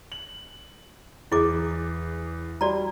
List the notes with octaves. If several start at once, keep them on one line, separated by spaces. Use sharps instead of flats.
F#7
E2 E4 G#4 D6
G3 F#4 D5 A#5